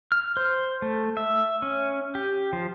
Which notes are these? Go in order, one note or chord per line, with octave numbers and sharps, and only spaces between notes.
F6
C5
A3
E5
C#4
G4
F3